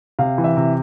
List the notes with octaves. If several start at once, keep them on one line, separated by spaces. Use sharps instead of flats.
C3 F5
E3
E5
C3